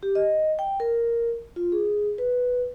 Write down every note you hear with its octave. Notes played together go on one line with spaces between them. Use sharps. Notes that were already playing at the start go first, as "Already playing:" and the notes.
G4
D#5
G5
A#4
F4
G#4
B4